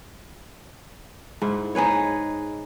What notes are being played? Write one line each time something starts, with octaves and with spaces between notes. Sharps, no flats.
G#2 E4
D#4 G#4 B4 C#5